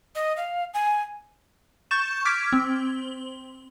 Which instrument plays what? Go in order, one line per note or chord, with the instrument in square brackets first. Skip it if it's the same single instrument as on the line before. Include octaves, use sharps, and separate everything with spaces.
[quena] D#5
F5
G#5
[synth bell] C#6 G6 A6 E7
D6 F6 G#6 B6 D7
C4